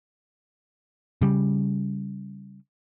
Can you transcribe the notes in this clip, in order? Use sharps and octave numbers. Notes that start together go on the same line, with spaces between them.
C#3 G3